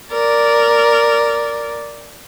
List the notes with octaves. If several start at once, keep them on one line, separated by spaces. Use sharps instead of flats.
A#4 D5